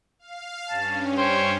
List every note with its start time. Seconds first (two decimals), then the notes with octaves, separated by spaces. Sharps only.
0.19 F5
0.69 G2 C#4 A5
1.18 C5 C#5 G5